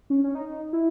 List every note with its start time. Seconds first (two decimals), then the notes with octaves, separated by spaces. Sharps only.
0.10 C#4
0.24 C#4
0.35 D#4
0.73 E4